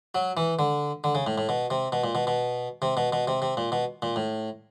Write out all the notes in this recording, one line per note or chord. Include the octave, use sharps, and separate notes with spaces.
F#3
E3
D3
D3
C#3
A2
A2
B2
C3
B2
A#2
B2
B2
C3
B2
B2
C3
C3
A#2
B2
A#2
A2